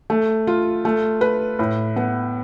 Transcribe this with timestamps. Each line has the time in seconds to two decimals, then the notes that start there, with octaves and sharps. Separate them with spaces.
0.10 A3
0.47 F4
0.85 A3
1.21 B4
1.59 A2
1.96 B3